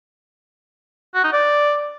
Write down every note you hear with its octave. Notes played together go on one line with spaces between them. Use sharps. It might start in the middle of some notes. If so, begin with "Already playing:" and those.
F#4
D#4
D5